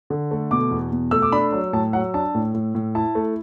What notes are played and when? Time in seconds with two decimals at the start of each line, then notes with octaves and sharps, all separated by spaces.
0.10 D3
0.31 A3
0.51 B2 D6
0.71 E2
0.92 B2
1.11 A3 E6
1.22 D6
1.32 D4 B5
1.52 F#3
1.73 A2 A5
1.93 F#3 F#5
2.14 D4 A5
2.35 A2
2.54 A2
2.75 A2
2.95 E4 A5
3.15 A3